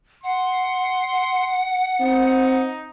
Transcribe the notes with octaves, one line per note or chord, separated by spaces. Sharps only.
F#5 C6
C4 D#4